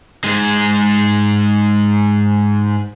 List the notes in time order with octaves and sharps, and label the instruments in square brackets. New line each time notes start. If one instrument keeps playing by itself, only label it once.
[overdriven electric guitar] G#2 G#3